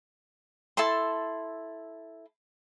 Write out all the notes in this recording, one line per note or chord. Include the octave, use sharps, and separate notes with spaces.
E4 A4 A5 C6